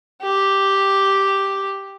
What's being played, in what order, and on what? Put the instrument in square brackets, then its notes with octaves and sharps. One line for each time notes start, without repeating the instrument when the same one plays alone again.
[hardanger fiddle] G4